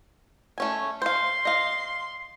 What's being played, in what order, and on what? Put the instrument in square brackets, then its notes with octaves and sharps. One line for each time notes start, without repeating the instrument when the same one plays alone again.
[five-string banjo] A3 C#4 G#5
[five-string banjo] C5 F5 [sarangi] C6
[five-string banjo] D#5 F5